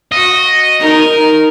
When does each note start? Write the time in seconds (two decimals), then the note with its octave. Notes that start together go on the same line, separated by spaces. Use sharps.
0.12 F#4 D#5
0.80 D#4 A#4